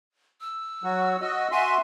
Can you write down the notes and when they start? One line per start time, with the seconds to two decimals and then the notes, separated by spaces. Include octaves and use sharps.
0.41 E6
0.83 F#3 F#4
1.21 F#4 D#5
1.51 F#4 E5 G#5 C6